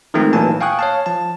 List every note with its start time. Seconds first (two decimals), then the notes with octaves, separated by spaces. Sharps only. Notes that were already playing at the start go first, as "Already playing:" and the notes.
0.14 D#3 F3 G#3 A3 C4 D#4
0.33 B1 A#2 E3 A#3 G#5 A5
0.61 F5 G5 G#5 C#6 D#6 F#6
0.79 C#5 F5 A5
1.06 F3 A5